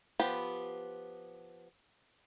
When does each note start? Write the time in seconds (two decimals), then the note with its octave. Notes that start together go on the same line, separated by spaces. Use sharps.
0.20 F3 B3 G4 B4